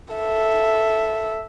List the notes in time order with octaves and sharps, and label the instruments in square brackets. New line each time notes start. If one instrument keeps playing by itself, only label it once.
[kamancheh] A4 E5